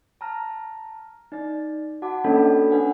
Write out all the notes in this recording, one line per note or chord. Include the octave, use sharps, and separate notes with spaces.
A5 A#5 F6 A#6
D#4 D5 A6
F#4 F#5 A5 D6
A#3 C#4 D4 A4 D#5 B5
C#4 D4 B4 F#5 G#5